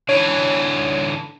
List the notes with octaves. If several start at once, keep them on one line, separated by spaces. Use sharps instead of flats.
D3 E3 C#5 G#6